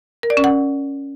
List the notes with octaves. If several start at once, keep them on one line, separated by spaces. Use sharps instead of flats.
A#4
D5
C#4
F#5